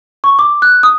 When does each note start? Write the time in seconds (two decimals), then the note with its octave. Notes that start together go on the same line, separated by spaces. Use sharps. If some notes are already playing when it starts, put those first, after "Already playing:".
0.24 C#6
0.39 D6
0.62 F#6
0.83 D#6